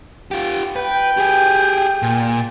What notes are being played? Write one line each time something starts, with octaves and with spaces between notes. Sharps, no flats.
F4 G4
B4 G5
G4 G#4
A#2